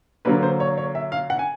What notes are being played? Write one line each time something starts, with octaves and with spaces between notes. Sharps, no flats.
D3 F#3 A#3 B4
C5
C#5
C#5
E5
F5
F#5
G#5